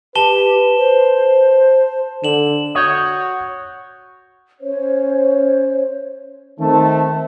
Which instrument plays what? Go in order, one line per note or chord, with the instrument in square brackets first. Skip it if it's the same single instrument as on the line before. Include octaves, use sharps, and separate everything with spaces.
[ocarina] G4 [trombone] B4 [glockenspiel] A5 E7 G7
[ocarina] C5
[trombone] D3 [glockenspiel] E7 F#7
[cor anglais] F#4 [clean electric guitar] C#5 [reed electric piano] D#6 G6
[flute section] C#4 C5 C#5
[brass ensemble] D#3 A3 C4 [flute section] A5